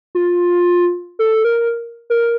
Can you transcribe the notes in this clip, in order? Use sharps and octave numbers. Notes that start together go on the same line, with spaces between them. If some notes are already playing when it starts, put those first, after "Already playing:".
F4
A4
A#4
A#4